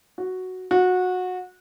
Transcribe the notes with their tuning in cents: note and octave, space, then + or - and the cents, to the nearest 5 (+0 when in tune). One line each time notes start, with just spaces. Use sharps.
F#4 +0
F#4 -20